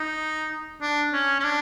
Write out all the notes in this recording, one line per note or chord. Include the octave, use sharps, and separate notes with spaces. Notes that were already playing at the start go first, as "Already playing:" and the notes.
Already playing: D#4
D4
C#4
C#4
D4